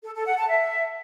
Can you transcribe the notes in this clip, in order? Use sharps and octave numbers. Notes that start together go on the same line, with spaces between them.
A4
A4
F#5
A5
E5